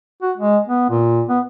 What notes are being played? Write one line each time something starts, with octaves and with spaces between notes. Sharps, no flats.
F#4
G#3
B3
A#2
B3